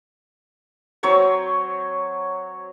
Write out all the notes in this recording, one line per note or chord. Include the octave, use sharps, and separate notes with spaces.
F#3 C4 C#5 C#6